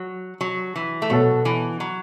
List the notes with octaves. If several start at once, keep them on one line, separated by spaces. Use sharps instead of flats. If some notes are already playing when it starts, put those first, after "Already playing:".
Already playing: F#3
F#3
E3
A3
B2 F#3 B3 A4 C#5
E3
F#3